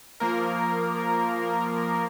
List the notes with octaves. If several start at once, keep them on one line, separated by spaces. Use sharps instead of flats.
F3 A#3 A#4